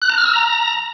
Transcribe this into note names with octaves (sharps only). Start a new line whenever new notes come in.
F#6
A#5
F6
E6
A#5